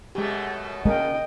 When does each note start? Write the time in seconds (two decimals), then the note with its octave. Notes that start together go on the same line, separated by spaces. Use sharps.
0.15 F#2 B2 G#3 A3 G4
0.85 C#3 A#3 G#4 A#4 D#5 G5